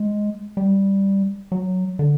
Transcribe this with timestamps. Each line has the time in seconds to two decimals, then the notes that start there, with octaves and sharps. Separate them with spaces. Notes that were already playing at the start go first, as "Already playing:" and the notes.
Already playing: G#3
0.57 G3
1.52 F#3
1.99 D3